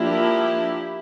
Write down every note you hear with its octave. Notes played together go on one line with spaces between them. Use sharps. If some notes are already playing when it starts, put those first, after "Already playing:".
Already playing: F3 A#3 D4 E4 G4